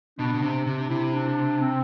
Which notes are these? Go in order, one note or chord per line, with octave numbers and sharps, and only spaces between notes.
B2 D4
B2
C3 D4
C3 D4
C3 E4
D4
C4